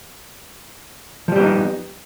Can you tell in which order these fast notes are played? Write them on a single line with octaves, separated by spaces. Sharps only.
F3 G3 G4 B3 D#4